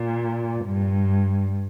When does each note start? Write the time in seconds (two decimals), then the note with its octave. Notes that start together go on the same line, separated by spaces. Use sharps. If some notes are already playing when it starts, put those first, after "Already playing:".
Already playing: A#2
0.66 G2